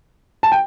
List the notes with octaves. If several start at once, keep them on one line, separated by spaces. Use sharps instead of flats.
A5
G5